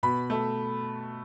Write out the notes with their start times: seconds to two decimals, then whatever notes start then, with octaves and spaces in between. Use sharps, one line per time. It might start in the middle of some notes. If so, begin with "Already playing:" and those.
0.03 B2 B5
0.30 A3